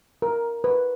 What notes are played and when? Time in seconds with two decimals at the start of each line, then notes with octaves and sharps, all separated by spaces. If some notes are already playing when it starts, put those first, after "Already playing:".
0.22 A#4
0.64 B4